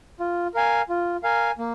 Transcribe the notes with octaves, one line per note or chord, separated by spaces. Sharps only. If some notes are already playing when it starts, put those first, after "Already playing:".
F4
A#4 F5 G#5
F4
A#4 F5 G#5
A#3